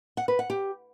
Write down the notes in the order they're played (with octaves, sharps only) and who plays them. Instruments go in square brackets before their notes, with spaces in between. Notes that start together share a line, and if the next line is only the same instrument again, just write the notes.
[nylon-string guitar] F#5
B4
F#5
G4